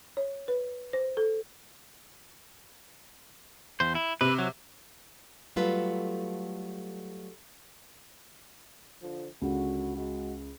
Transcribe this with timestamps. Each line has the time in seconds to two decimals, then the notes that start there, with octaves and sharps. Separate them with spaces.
0.17 C#5
0.48 B4
0.93 C5
1.17 A4
3.80 E2 C5
3.95 E4
4.21 C3 B4
4.39 F#3
5.56 F#3 G3 A3 F4 A4 B4
9.02 D3 F3
9.41 C#2 D3 F#4
9.96 G#3 F#4